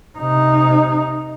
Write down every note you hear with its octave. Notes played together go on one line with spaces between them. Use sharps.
C3 D#4